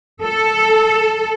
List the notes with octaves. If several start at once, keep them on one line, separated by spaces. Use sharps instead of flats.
A4